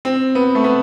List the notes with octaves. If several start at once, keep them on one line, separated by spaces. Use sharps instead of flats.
C4
B3
A3
B3